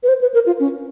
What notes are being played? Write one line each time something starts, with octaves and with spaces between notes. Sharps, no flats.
B4
C5
B4
A#4
F4
C#4